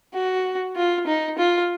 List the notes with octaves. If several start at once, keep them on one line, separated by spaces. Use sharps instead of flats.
F#4
F4
D#4
F4